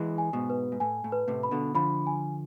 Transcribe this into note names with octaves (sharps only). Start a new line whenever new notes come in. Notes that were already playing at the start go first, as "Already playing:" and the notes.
Already playing: E3 G#3
G#5
G#2 B2
B4
G#2
A2 G#5
A2
B4
A2 C3
B5
B2 D3
D3 F3 B5
G#5